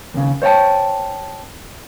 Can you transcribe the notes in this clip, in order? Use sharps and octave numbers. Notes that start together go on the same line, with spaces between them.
D#2 C#3
C5 C#5 E5 G5 A5